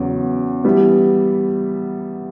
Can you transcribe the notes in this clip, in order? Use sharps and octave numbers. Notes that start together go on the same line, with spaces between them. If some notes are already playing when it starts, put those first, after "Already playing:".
Already playing: E2 C#3 F#3
E3 G3 B3 E4